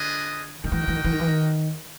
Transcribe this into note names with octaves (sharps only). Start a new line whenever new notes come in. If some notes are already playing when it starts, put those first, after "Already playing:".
Already playing: D3 D4 F4 G#4 B4 D#5
D#3 F#4 A#4 D#5 G5
E3
D#3
E3
D#3
E3
D#3
E3
D#3